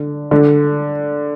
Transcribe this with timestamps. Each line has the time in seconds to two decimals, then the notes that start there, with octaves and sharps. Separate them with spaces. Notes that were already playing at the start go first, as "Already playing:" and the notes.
Already playing: D3
0.31 D3